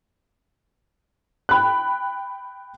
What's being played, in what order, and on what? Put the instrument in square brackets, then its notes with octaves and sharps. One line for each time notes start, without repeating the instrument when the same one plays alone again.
[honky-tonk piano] G5 B5 F#6